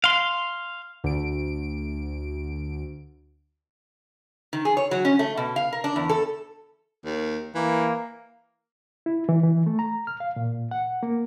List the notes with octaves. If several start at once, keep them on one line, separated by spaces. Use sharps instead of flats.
F5 C6
D2 D7
D#3
G#4
C#5
F#3
C#4
A3
B2
F5
A#4
D4
E2
A4
D#2
E3 A#3
E4
E3
E3
A3
A#5
F6
F5
A#2
F#5
A#3